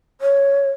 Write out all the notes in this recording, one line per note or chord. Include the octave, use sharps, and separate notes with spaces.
C#5